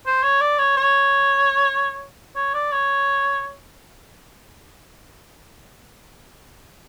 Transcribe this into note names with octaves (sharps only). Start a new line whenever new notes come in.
C5
C#5
D5
C#5
C#5
C#5
D5
C#5